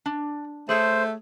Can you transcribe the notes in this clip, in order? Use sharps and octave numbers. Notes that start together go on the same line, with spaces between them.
D4
A3 G#4 A4 C5 C#5